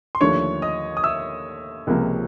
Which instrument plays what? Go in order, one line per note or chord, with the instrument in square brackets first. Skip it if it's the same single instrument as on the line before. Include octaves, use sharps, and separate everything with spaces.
[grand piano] C6
[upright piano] D#2 D3 F3 A3 D4 [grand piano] C#5 C#6
[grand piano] D#5 D#6
D#6
E5 E6
[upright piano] C#2 C3 F3 A#3